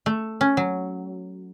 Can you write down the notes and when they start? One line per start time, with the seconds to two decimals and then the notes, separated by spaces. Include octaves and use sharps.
0.06 A3
0.41 C#4
0.57 F#3